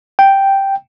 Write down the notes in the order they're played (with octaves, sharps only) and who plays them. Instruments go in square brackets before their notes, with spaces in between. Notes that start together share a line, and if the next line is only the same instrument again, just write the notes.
[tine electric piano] G5